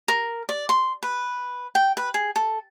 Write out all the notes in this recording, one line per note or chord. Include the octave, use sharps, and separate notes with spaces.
A#4
D5
C6
B4
G5
B4
G#4
A4